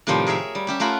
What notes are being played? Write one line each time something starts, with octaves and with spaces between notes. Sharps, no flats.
A2 C3 D#3 F3 G3 C4
G#4 A#4 C#5 E5
G3
C#4 G4 E5
A3 F4 A#4 F#5 G#5 B5